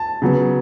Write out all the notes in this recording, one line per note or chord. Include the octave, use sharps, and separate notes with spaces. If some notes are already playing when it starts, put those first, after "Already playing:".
Already playing: A5
C#3 F#3 B3